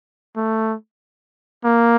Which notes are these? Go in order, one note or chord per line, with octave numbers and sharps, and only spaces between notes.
A3
A#3